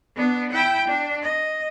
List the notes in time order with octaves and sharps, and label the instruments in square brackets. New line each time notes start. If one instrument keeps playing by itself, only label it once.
[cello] B3 D4
E4 G5
D4
D#5